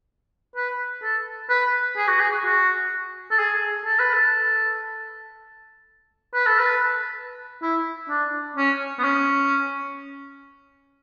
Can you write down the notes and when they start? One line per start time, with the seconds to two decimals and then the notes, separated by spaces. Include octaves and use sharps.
0.56 B4
1.03 A4
1.50 B4
1.97 G#4
2.08 F#4
2.20 G#4
2.44 F#4
3.31 A4
3.39 G#4
3.85 A4
3.99 B4
4.13 A4
6.34 B4
6.47 A4
6.59 B4
7.62 E4
8.09 D4
8.57 C#4
8.99 B3
9.04 C#4